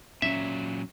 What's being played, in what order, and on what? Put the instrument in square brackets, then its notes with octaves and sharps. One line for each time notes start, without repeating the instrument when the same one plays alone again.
[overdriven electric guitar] A#2 F#3 [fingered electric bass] C4 C#4 [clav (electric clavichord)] E5